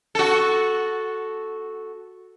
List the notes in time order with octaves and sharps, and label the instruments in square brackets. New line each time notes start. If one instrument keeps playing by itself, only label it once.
[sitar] F#4 A4